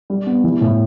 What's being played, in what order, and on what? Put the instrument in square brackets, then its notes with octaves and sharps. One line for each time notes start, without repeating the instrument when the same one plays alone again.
[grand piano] G3
B3
E3
A2